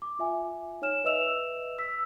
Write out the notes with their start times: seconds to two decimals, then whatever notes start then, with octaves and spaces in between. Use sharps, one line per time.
0.02 D6
0.19 F4 E5 G#5
0.82 D#4 C#5 G#5 F6 E7
1.04 B4 D#5 E5 E6 E7 F7
1.78 E6 B6